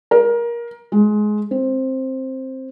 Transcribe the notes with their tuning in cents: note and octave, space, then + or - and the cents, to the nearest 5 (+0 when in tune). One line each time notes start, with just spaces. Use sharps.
A#4 +20
G#3 +20
C4 +10